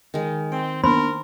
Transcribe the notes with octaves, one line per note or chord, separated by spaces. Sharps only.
D#3 G#3
C4 G5
A#3 B3 D4 A#4 C5 B5 C6